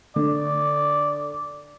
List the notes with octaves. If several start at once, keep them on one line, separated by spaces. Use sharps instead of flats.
D3 D5